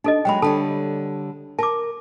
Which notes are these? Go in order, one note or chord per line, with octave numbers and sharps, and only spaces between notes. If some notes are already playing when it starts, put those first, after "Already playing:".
D4 D#4 A4 D#5
F#3 G#3 D#5 G5 B5
D3 G3 A4 C#5 A5
A#4 A5 D6